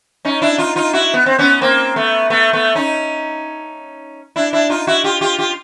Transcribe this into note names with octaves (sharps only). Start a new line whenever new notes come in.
C#4 D#4
D4 E4
D#4 F4
D#4 F4
E4 F#4
B3
C4
B3 C#4
A#3 C4
A3 B3
A3 B3
A3 B3
C#4 D#4
D4 E4
D4 E4
D#4 F4
E4 F#4
F4 G4
F4 G4
F4 G4